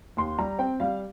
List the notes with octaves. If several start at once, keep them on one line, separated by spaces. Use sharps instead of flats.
D#2 C6
G3 A#5
C4 G5
G3 F5